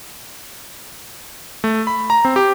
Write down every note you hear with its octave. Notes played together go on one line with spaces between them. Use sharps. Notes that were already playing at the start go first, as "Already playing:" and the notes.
A3
B5
A#5
C4
G4